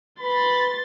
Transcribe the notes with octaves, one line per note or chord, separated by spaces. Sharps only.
B4 B5 C6 A6